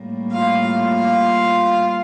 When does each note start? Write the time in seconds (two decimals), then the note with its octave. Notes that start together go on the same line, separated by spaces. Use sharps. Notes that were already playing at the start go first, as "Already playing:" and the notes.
Already playing: A2 G3 A#3
0.32 F4 F5
0.82 F4 F5